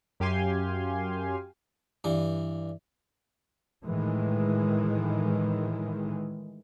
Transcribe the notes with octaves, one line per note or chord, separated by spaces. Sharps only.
F#2 G4 F5 G#5 C6
G2 E3
A2 D#3 E3 G#3